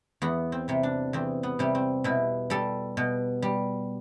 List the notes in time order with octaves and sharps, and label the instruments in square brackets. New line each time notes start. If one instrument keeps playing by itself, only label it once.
[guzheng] E2 B3
C4
C3 G3
D4
E2 C4
B3
C3 G3
C4
B2 E4
G3 A4
B2
G3